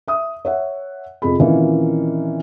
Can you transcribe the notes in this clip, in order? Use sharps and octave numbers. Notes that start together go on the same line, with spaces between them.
E5 D#6
C#5 E5 F#5
F2 C3 G#4 B5
A#2 D#3 E3 A#3 C4 C#4